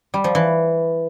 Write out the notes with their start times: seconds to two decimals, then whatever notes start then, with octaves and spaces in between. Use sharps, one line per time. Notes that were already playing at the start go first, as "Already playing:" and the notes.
0.14 G3
0.24 F3
0.35 E3